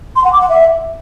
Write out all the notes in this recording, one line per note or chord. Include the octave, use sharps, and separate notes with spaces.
C6
F#5
D6
F#5
E5